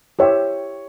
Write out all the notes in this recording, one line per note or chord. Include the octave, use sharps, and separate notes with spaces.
E4 G4 C5 C#5 E5